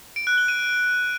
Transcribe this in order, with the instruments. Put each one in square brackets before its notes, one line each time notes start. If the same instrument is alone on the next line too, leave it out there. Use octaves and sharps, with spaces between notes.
[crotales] D7
F#6
G7
D#7